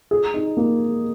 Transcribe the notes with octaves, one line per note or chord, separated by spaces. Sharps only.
G#4
D#4
A#3